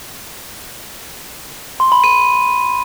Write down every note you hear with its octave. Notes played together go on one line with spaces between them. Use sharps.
C6
B5
D#7